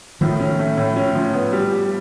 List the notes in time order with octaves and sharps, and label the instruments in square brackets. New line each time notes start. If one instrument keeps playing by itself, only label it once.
[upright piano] A2 [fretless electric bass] D#3 F3
[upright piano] C#4
A3
A2
C#4
F3
B3
G3
G4